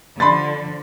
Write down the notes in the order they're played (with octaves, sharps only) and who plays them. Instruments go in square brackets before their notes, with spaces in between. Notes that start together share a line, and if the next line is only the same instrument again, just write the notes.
[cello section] D3 F3 [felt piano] B5 C6 A6